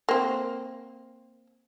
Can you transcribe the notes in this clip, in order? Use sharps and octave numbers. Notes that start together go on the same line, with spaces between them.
A#3 C4